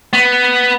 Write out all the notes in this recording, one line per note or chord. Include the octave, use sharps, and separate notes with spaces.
B3